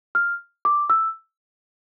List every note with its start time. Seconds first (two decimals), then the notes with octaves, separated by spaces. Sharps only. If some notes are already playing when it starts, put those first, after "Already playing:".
0.15 F6
0.65 D6
0.90 E6